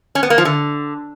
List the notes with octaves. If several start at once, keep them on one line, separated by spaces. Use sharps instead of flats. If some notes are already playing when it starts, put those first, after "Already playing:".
C#4
B3
A#3
F3
D3